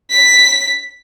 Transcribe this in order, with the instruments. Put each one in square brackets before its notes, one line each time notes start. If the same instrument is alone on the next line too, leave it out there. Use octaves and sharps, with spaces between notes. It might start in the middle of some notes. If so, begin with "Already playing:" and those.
[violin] B6